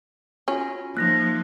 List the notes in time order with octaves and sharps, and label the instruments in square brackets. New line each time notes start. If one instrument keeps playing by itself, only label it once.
[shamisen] C#4 [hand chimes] F4 F#4
[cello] F3 [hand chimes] A#3 D#4 [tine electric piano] F#6 A#6